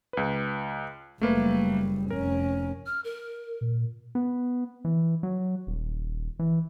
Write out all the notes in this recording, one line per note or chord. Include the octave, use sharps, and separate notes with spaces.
C#2 B4
F#1 G3 A3 A#3 B4
F1 C#4 A#4
F6
A#4
A#2
B3
E3
F#3
D#1
E3